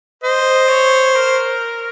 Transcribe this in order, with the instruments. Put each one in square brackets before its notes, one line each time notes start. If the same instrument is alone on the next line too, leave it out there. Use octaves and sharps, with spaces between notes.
[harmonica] C5 [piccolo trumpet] D#5
[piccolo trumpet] C#5
A#4